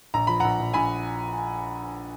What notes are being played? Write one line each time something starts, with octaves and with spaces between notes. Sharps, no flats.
A#1 A#5
F3 B5
A#1 F#5 A#5
A#1
A#1 G#5 B5